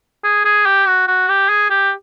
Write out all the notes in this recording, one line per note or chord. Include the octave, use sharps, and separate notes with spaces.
G#4
G#4
G4
F#4
F#4
G4
G#4
G4